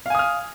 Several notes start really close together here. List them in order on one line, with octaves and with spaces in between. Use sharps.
F5 G#5 D#6 F6